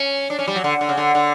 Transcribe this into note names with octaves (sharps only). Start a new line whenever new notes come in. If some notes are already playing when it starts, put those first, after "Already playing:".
Already playing: C#4
D4
C#4
G3
F#3
D3
D3
C#3
D3
D3